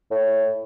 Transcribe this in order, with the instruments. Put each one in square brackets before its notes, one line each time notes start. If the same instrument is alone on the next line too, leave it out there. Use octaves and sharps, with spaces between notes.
[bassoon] A2